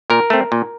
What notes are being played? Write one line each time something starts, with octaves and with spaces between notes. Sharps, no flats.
A#2 A#4
A3 C4
A#2